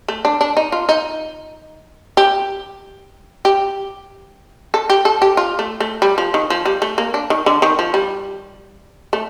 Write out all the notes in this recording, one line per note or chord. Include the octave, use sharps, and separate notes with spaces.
A3
D4
D4
D#4
F4
D#4
G4
G4
A4
G4
A4
G4
F4
A3
A3
G3
F3
D#3
F3
G3
A3
A#3
D4
D#3
D3
D#3
F3
G3
A3